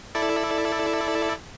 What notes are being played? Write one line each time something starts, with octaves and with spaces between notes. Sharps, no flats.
E4 A4 D5